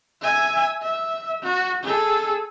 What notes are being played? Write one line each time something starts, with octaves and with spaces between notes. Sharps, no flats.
E5 G#5
E5
F#4
G#4 A4